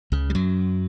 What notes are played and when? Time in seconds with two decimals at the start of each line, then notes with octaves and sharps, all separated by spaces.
0.12 C#2 C#3
0.30 G3
0.35 F#2 F#3